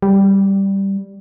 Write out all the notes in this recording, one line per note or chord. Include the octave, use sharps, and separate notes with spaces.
G3